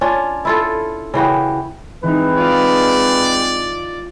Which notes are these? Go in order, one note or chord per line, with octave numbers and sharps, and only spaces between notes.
C#4 D4 F4
E4 F4 A4
C#3 E3 F#4 G4
E3 G#3 C4 D#4 B4
F4 D5 D#5 F5